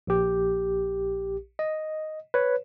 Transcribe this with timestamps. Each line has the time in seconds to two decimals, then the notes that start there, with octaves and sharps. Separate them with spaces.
0.07 A#1 G4
1.59 D#5
2.34 B4 C#5